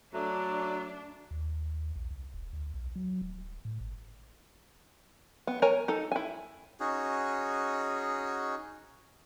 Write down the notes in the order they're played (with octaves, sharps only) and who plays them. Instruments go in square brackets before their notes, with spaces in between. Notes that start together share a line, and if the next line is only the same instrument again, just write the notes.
[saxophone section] F#3 A3 [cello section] D4
[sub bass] D#2
A#1
C2
D#1
D2
B1
F#3
D1
A2
G#1
[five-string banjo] B3
A#4 C#5 G#5 A#5
D#4 A4
E4 G#5
[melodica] C#4 D#4 F#4 G#4